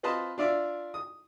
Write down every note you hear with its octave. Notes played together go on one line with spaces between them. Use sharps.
C4 F4 B4 C5 D#5 A5
D4 F4 D5 E5
D#6